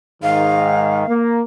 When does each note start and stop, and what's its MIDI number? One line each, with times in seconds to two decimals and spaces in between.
0.23 1.03 44
0.23 1.03 51
0.23 1.14 77
1.08 1.41 58